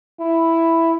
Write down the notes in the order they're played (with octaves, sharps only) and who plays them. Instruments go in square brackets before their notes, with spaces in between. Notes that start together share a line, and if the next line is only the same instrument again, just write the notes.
[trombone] E4